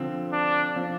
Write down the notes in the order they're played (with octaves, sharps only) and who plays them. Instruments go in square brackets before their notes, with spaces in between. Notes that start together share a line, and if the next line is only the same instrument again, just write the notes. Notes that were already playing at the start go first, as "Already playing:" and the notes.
Already playing: [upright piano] D3 F3 C4
[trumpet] D4
[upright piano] F3 C4 F4